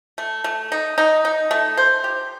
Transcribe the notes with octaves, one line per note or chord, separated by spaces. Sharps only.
A3
A3
D#4
D#4
D#4
A3
C5
G4